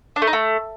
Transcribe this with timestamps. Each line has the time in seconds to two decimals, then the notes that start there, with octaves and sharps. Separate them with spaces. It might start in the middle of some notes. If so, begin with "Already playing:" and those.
0.16 D4
0.22 A3
0.27 D#4
0.33 A3